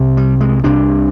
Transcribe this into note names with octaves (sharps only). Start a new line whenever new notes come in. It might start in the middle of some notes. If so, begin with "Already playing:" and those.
Already playing: C2 C3
G3
G#3
C2 C3 D4